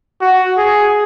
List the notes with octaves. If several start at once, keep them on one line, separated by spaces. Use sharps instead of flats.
F#4
G#4